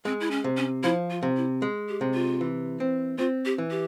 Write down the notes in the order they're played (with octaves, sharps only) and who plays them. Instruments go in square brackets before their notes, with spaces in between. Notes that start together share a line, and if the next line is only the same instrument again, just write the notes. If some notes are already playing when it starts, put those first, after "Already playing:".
[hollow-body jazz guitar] G#3 [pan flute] C4
[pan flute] E4
C#4
[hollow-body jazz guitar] C3
[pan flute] C#4
[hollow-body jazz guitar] F3 [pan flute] E4
[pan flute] F4
[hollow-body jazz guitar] C3
[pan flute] E4
[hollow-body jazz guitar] G#3
[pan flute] G4
[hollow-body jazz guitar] C3
[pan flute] F4
[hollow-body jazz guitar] E3
C4
[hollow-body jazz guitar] C4 [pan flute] F4
[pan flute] G4
[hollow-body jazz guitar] E3
[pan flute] G4